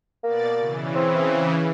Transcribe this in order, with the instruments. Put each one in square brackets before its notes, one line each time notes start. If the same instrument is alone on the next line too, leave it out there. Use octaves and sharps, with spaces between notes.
[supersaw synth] B2 D5 A6 [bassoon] A#3
[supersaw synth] C#3 E3
[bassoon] C4